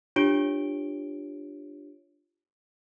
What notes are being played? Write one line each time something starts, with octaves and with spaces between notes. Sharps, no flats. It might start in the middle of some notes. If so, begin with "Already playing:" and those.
D4 F4 G4 C#5 D7 G7